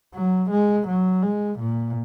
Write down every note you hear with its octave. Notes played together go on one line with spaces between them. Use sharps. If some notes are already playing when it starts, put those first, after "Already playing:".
F#3
G#3
F#3
G#3
A#2